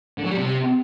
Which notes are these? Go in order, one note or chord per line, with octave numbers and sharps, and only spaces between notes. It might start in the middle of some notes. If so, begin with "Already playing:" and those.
D3
F#3
G3
C3